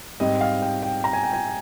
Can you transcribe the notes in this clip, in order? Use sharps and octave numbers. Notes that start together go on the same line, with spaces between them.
G#2 G3 C4 D#5
F5
G5
G5
A#5
G#5
G5
G#5